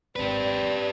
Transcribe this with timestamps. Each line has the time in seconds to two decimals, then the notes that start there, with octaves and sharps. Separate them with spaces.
0.16 G#1 E2 C4 G4 B4 D5